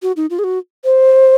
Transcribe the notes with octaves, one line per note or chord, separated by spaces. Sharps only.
F#4
D#4
F4
G#4
F#4
C5